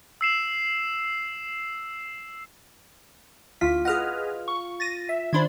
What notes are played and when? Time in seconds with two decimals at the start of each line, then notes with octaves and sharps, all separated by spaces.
0.21 E6 C7 E7
3.61 D2 F4 B6
3.85 G#4 B4 D#5 F#5 F6
4.48 C#6
4.80 A6 A#6 D#7
5.09 E5
5.33 D#3 D4 C5 B5 C6 G#6